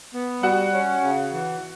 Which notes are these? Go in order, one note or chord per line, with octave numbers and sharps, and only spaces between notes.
B3
G3 F#4 F#5
C#4
C#3
E3